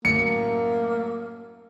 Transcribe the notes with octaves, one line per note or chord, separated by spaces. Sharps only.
F#2 A2 A#3 C#7